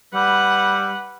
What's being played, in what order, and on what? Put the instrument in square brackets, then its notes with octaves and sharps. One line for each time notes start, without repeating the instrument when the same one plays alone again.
[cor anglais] G3 [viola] B4 F#5